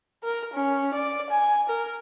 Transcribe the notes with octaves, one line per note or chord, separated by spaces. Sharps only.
A#4
C#4
D5
G#5
A#4